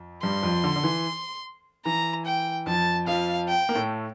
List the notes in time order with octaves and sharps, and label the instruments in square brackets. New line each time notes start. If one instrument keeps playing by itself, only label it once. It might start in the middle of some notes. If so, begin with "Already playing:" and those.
Already playing: [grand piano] F2
[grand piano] G2 G3 [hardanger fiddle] C6
[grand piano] F2 F3
D3
D3
E3
[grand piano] E3 [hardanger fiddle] A#5
[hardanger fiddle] G5
[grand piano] F2 F3 [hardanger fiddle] A5
[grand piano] F2 F3 [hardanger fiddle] F5
[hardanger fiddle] G5
[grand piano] A#3
A2 A3